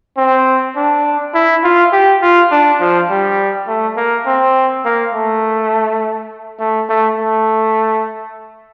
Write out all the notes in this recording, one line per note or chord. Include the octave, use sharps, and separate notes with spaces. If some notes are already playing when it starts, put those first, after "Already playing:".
C4
D4
E4
F4
G4
F4
D4
F3
G3
A3
A#3
C4
A#3
A3
A3
A3
A3